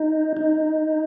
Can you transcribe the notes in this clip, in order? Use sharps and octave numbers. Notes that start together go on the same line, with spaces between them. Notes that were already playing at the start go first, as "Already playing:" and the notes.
Already playing: D#4
D#4